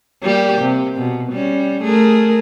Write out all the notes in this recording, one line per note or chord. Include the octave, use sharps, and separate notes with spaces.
G3 A#3 G4
C3
B2
G3 C#4
A3 G#4 A#4